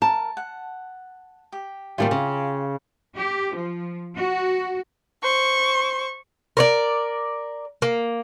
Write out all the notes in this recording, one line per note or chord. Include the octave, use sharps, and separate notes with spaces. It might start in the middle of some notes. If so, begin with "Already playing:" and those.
A#4 A5
F#5
G4
A#2 D#3 G3 F4 G4 G#5
C#3
G4
F3
F#4
C5 C#6
A#4 C#5 D5
A#3